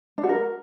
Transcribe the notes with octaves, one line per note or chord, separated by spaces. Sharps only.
D4
F#4
A#4